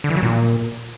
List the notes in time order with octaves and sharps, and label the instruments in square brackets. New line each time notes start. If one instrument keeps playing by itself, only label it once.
[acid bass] D3
E3
F#3
A#2